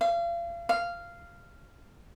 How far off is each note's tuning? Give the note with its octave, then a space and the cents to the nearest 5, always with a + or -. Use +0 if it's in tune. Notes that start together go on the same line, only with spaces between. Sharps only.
F5 -35
F5 -10